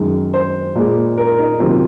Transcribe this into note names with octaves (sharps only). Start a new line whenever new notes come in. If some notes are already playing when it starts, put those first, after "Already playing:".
Already playing: F#2 D#3 G#3
C5
A#2 G#3
A#4
D#4
C3 D#3 F#3 A#3 F4